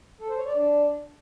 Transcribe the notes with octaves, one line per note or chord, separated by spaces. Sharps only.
A4
C5
C#5
D5
D4